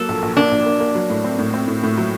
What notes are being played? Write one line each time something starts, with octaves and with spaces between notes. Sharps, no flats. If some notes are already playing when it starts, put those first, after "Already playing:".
Already playing: F#3 A#3 A4
A#1
A#1
A#3 D4
A#1
A#3
A#3
F#3
A2
C4
A2
C4
A2
A2
F#3